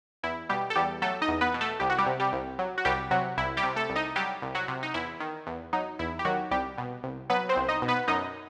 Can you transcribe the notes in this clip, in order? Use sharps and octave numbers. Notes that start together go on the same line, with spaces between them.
E2 E4
B2 G3 G4
A4
E2 G3 G4
F#3 A3 A4
D#4 D#5
E2
B3 B4
B2
A3 A4
C2 G4
F#4
G3 G4
C3
G3 G4
C2
F#3
F#4
C2 G3 G4
C3 F#3 F#4
C2 E4
G3 G4
C3
A3 A4
C2
D#4 D#5
F#3 G3 G4
C2
F#3 F#4
C3
D#4
E2 E4
D#3
E2
F#3 D#4
E2 E4
G4
D#3 F#3 F#4
C2 G3 G4
B2
C2
F#3 B3 B4
C4 C5
C2
D#4 D#5
B2
B3 B4
F#2 D#4 D#5